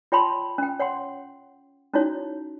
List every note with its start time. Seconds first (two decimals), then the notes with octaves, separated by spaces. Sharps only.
0.12 F4 C#5 G5 A5 B5 C6
0.58 C#4 G5
0.79 C#5 F#5 G5 C6
1.94 C#4 D#4 E4 F#4 C#5